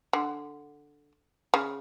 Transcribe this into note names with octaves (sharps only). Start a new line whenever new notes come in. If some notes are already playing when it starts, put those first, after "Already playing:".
D3
C#3